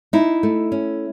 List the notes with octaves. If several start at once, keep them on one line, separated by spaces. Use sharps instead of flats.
D#4 E4
A3
C#4